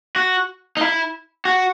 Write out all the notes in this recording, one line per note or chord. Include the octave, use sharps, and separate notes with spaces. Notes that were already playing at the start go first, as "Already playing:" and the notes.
F#4
D#4
E4
F#4